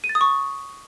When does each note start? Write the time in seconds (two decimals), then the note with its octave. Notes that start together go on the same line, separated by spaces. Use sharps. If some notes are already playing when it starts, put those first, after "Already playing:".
0.04 D#7
0.09 A6
0.15 D#6
0.21 C#6